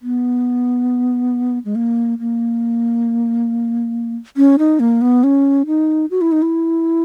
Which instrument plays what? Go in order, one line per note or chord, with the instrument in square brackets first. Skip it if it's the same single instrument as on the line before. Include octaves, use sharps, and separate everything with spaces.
[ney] B3
G#3
A#3
A#3
C#4
D#4
A#3
B3
C#4
D#4
F#4
E4
D#4
E4